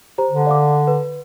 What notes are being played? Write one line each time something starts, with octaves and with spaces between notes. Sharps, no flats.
G4 C5 A#5
D3
D5 F5 D6
B4